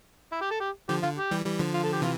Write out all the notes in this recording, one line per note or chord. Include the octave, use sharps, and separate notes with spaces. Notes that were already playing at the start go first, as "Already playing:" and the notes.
E4
G4
A4
G4
D3 F3 G4
D3 F4
G4
E3 G3
E3 G3
D3 F3
F4
A4
G4
C3 E3 F4